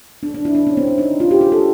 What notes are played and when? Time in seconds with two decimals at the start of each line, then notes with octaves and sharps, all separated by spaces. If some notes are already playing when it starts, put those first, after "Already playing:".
0.23 D4
0.34 D4
0.45 E4
0.55 D4
0.67 C#4
0.77 C4
0.87 C#4
0.98 D#4
1.20 F4
1.31 G4
1.41 G#4
1.52 A4